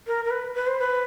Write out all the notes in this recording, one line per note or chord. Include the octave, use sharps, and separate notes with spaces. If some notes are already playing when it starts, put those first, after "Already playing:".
A#4
A#4
B4
B4
C5
B4